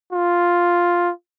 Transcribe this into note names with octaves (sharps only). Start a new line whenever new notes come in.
F4